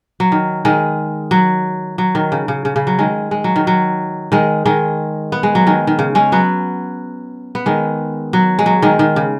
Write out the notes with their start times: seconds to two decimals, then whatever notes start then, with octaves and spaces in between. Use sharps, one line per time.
0.20 F#3
0.32 D#3
0.65 D#3 G#3
1.31 F#3
1.98 F#3
2.15 D#3
2.32 C#3
2.48 C#3
2.65 C#3
2.76 C#3
2.87 F#3
2.99 D#3 G#3
3.31 G#3
3.44 F#3
3.56 D#3
3.67 F#3
4.32 D#3 G#3
4.66 D#3 G#3
5.32 B3
5.43 G#3
5.55 F#3
5.67 D#3 G#3
5.87 D#3
5.99 C#3
6.15 G#3 C#4
6.32 F#3 B3
7.55 B3
7.66 D#3 G#3
8.33 F#3
8.59 G#3
8.66 F#3
8.82 D#3 G#3
8.99 D#3
9.16 C#3